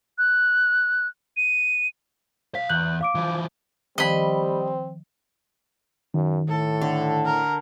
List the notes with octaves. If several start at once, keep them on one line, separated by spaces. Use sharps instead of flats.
F#6
D#7
B1 F5 B6
E2 F#6 G6 F#7
F5 D6 D7
E3 F3
D#3 F3 G3 C4 D#5 B5
F#2 D#3
A2 A4
D3
A#4